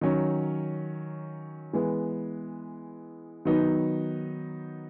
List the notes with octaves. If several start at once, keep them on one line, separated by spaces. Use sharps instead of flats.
D#3 F#3 C#4
E3 G#3 B3
D#3 F#3 B3 D#4